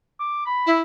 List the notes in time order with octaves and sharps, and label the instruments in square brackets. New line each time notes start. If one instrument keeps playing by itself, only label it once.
[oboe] D6
B5
[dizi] E4